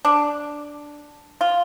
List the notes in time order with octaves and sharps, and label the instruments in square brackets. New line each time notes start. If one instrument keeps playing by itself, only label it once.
[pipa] D4
F4